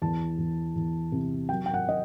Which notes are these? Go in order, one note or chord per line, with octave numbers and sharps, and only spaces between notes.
E2 A5
E2
E2
C3
F#3 G5
G5
F#5
D#5